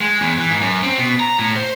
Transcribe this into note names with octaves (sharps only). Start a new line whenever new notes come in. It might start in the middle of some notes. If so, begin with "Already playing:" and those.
G#3
E2
E3
G#2
F#2
C4
B2
A#5
A2
C5